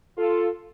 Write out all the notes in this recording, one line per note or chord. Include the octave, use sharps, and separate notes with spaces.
F4 A4